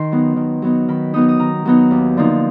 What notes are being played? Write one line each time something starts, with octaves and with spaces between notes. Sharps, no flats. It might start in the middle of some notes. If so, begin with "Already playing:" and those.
Already playing: D#3 C6
F#3 B3 D#4
D#3
F#3 B3 D#4
D#3 B5
F#3 B3 D#4 D#6
D#6
D#3 A#5
F#3 B3 D#4
D#2
D3 F3 A#3 D#4